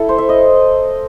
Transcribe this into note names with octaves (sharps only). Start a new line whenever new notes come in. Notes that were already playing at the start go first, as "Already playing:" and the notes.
Already playing: E4 A4
C5
E5
D#5